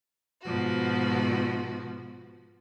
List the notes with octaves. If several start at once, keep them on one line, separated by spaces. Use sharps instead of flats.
G#2 B2 F3 F#4